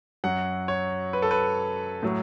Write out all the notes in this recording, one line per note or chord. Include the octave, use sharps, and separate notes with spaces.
F#2 F#3 F#5
C#5
B4
A4
B4
A2 F#3